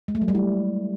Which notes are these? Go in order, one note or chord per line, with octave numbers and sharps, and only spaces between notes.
G#3
A3
F#3
G3
E4